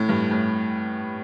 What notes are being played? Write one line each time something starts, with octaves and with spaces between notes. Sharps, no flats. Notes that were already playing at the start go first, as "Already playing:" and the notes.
Already playing: A2
G2
A2